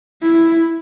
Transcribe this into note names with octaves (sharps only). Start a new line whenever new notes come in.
E4